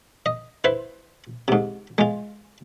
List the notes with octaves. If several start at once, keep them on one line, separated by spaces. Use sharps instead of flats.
D#5
E4 B4 C5
G#2 C3
G#3 F4